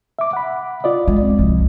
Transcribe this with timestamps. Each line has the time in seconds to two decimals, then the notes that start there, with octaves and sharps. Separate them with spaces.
0.19 E5 D6
0.33 F#5 B5
0.84 F4 D5 D#5
1.08 G#3
1.23 C4
1.39 C2 F3